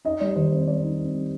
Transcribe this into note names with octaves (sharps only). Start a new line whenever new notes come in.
D#4 D#5
G3 D5
D#3 C5
C4 C5
G3 D5
D#4
C4
G3